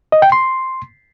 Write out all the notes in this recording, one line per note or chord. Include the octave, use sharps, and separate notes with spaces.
D#5
G5
C6